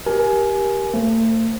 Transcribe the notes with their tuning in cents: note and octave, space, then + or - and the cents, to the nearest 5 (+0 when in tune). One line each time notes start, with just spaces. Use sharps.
G4 +0 A#4 +20 G#5 +20
A3 +40 C5 +0